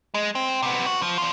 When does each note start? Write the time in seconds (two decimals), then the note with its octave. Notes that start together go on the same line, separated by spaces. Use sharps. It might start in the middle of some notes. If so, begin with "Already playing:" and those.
0.14 G#3
0.35 C4
0.62 C3 B3
0.86 F#4
1.02 F3
1.18 D4 F4